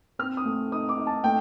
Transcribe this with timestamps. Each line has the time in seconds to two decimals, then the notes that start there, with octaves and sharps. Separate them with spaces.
0.19 C4 F6
0.37 D#6
0.45 A3
0.72 D#4 D#6
0.89 D6
0.98 D#4
1.07 A5
1.24 A3 G5